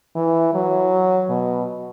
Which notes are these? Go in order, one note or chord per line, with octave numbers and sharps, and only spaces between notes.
E3
F#3
B2